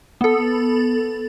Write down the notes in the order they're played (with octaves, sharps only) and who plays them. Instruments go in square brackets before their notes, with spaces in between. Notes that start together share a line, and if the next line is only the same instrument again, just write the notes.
[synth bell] B3 A4